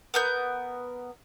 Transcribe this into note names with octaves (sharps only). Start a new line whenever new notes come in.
B3 A#4 G6